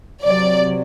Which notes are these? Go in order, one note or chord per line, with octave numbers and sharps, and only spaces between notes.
C3 F#3 D5